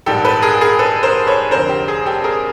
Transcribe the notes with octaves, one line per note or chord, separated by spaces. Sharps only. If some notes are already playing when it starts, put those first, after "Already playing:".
A#1 G#2 D#3 G3 G4 A4
A4 B4
G#4 A#4
G#4 A#4
A4 B4
A#4 C5
B4 C#5
F1 F2 D3 A#4 C5
G4
G#4
G4 A4
G#4 A#4